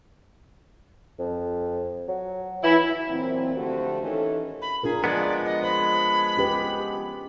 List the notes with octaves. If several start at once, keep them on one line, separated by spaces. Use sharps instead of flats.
F2
F#3
E3 E4
F#2 A#2 E3 C4
D3 F3 A3 F#4 G4 C5
D#3 E3 C#4 A4
B5
D4 F4 G#4 A#4
F3 G#3 B3 D5
D#5
C5 B5
C#4 G4 B4